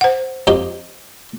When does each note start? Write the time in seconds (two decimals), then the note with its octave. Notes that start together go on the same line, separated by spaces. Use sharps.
0.01 C5 F#5
0.47 F2 D#4 G4